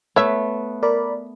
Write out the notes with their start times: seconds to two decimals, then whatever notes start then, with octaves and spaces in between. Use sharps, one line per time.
0.16 A3 B3 C#5 E5
0.83 A#4 D5 B5